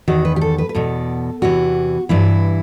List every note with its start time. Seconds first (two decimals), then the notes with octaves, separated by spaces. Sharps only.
0.08 E2 D#3 F#4
0.25 B4
0.36 G4
0.41 A4
0.58 B4
0.69 B4
0.75 E2 B2 A4
1.42 E2 C3 E3 F#4
2.09 G2 E3 E4